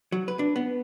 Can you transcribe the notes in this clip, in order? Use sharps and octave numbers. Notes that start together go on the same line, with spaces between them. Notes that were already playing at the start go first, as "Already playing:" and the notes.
F#3
B4
D4
B3